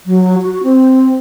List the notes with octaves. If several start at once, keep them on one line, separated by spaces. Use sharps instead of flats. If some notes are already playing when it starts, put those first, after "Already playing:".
F#3
F#4
C4